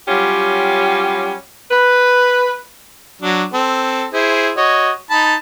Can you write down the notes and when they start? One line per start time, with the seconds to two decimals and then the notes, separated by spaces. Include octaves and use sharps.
0.08 F#3 G3 C#4 F4 G4
1.71 B4
3.22 F#3 D4
3.53 C4 A4
4.13 E4 G#4 C5
4.57 F#4 C#5 D#5
5.10 D#4 A5 B5